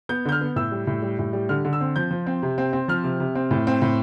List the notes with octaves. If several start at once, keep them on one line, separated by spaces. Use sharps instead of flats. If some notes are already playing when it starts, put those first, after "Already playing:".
B3 G6
D3 G6
F6
B3
A2 E6
G3
A2
G3
A2
G3
D3 F6
D3
E6
C4
F3 G6
F3
C4
C3
C4
C4
F3 F6
C3
C3
C4
A2
C4
A2